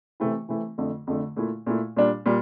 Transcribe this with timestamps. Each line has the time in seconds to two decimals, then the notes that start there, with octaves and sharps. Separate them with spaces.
0.20 C3 E3 A3 C4 E4
0.49 C3 E3 A3 C4 E4
0.78 F2 D3 A3
1.07 F2 D3 A3
1.37 A#2 A3 E4
1.67 A#2 A3 E4
1.97 A#2 G3 D4
2.26 A#2 G3